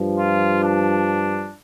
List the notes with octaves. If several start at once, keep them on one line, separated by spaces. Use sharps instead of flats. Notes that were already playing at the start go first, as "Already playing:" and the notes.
Already playing: G2 F3
F4
D4